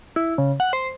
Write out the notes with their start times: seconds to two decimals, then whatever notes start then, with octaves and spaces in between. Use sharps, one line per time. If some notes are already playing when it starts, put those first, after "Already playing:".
0.16 E4
0.38 C#3
0.60 F#5
0.73 C5